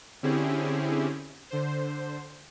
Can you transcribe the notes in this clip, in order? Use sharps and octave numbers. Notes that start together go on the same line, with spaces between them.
D3 C4 C#4 E4 G4 G#4
D3 C5